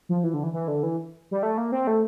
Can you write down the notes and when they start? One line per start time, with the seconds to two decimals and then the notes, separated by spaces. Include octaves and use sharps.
0.09 F3
0.24 E3
0.34 D3
0.43 E3
0.53 E3
0.68 D3
0.83 E3
1.31 G3
1.43 A3
1.57 A#3
1.72 C4
1.87 A3